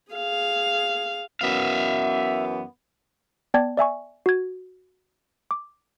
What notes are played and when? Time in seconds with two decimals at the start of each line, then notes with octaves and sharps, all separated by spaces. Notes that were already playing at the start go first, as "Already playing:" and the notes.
0.12 G#4 F5
1.41 F#2 E3 B3 E5 F5
3.54 B3 D5 G5 A5 G#6
3.77 D5 E5 G#5 C#6
4.26 F#4 G#6
5.51 D6